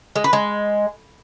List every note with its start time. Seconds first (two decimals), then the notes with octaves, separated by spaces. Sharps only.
0.16 G#3
0.24 B4
0.33 G#3